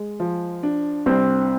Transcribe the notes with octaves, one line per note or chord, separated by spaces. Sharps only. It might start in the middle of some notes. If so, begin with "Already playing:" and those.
Already playing: G#3
F3
D4
C2 C4